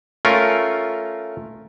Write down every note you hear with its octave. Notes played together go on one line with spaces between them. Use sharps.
A3 C#4 F4 A#4